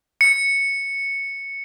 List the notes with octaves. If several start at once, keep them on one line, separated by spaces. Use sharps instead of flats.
C#7